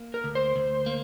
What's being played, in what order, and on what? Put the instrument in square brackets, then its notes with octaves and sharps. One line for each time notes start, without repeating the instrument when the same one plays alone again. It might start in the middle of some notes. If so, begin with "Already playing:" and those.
Already playing: [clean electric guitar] A#3
[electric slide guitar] A#4
[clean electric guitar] D2
[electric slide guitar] C5
[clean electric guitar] D2
A#3